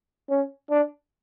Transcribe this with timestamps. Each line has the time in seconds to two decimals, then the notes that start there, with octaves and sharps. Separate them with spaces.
0.29 C#4
0.70 D4